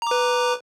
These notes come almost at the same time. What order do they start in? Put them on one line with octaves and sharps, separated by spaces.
A#5 D6 B4